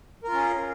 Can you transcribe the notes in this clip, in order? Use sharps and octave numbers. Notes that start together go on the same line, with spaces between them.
C#4 F4 G#4 A#4